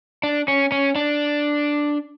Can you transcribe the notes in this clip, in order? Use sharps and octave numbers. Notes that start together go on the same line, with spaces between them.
D4
C#4
C#4
D4